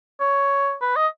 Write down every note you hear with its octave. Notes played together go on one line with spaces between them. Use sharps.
C#5
B4
D#5